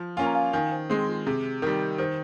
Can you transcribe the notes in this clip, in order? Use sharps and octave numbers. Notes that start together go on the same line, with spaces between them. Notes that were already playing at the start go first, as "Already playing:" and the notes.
Already playing: F3
A#3 C#4 F4 G#5
A#5
F5 G#5
D#3 F5 G#5
C5
G#3 C4 G#4
F4
C3 G#4
D#3 G3 A#4
D#3 C5